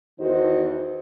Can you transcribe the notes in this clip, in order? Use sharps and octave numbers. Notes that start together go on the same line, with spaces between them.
E2 D#3 D#4 F#4 C5